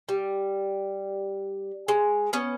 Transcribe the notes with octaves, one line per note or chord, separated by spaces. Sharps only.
G3
G#3
B3 C#4